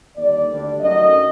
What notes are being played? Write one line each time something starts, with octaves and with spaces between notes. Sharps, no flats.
D#2 D3 G3 D5
D2 D3 G3 D4
F#2 D#3 F#3 A3 D#5